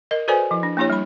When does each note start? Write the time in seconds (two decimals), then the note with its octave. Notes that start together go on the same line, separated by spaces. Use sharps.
0.11 A#4 D#5
0.28 F#4 A4 B4 C5 D5 G#5
0.51 F3 E4
0.63 D4
0.77 A#3 D4 E4 G4 C#5
0.90 G3 B5